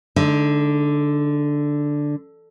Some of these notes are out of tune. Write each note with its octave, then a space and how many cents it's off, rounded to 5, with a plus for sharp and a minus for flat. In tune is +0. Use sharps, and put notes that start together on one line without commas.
D3 +0 G#3 +40 D#4 +0